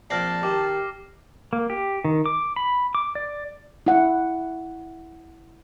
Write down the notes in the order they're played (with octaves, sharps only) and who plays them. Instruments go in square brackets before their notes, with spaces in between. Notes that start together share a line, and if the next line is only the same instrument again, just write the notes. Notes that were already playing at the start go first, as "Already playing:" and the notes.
[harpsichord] A#1 C4 D5 [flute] A5 [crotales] F6 A#6 C7
[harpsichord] D#3 [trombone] G4 [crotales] D6
[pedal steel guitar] A#3
G4
D#3
D6
B5
D6
D5
[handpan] E4 F#5